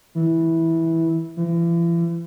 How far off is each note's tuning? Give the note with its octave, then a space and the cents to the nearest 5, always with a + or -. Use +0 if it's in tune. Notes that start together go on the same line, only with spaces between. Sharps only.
E3 -10
E3 +40